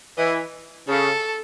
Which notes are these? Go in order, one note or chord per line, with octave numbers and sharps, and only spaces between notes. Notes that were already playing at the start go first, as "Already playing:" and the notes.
E3 D#5
C#3 A4